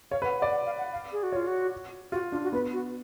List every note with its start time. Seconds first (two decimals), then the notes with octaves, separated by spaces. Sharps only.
0.11 C#5 F5
0.22 B4
0.25 F#5
0.39 F#5
0.42 D5
0.51 F#5
0.66 F5
0.78 F#5
0.92 F5
1.12 G#4
1.23 F#4
1.32 F4 C#5
1.47 F#4
2.12 F4 F#4
2.32 D4 F4
2.43 F#4
2.52 B3 B4
2.73 F#4